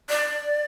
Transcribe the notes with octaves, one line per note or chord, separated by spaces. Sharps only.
D5